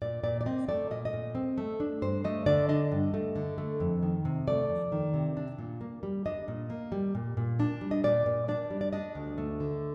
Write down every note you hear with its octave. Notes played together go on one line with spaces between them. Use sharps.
A#2 D5
A#2 D5
D5
C4 D#5
A3 D5
A#2 D#5
D#5
A#2
C4
A3
D4
G2 C5
A3 D#5
D3 D5
D4 D#5
G2
A3
D3
A3
F2
D#3
C3
A3 D5
F2
D#3
C3
D4
A#2
A#3
G3
D4 D#5
A#2
A#3
G3
A#2
A#2
D4
G3
D#5
A#2 D5
A#2
D4 D5
G3
D5
D4 D#5
D2
A3
D3